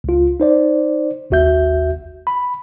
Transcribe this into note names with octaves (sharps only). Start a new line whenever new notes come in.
C#2 F4
D#4 C5 D5
G#1 D#2 F#4 E5 G6
B5